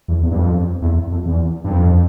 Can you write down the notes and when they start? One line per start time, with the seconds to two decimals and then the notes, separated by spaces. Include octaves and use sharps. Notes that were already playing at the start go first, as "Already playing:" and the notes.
0.08 E2
0.23 E2
0.31 G2
0.38 F2
0.82 E2
1.11 F2
1.26 E2
1.64 G2
1.70 F2